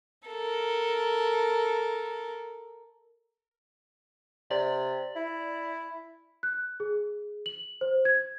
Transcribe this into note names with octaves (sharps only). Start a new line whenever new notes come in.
A4 A#4
C3 D5
E4
F#6
G#4
F#7
C5
G#6